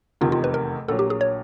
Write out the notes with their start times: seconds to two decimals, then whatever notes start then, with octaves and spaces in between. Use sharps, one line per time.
0.21 F1 E2 C3 D#3 F4
0.32 F4
0.44 B4
0.54 A#4
0.88 A#1 A#2 F#3 A4
0.99 G4
1.10 G#4
1.21 C#5